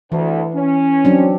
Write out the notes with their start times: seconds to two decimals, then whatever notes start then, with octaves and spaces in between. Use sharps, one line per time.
0.12 D2 E3
0.55 C#4
1.05 F#3 C4 D4